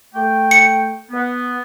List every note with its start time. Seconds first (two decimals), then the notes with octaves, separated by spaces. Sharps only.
0.14 A3 G5
0.51 C#7
1.11 B3